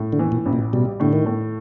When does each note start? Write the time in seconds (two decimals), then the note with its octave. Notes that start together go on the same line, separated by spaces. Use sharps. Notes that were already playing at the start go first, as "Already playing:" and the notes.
Already playing: A2
0.13 D3
0.19 E3
0.32 A#2
0.46 A1
0.53 A#2
0.73 B2 G3
1.00 A2 D3
1.13 D#3
1.26 A2